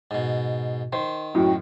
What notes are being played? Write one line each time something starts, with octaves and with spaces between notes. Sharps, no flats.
G#2 B2
D#3 C5
F#2 A2 F#4 G5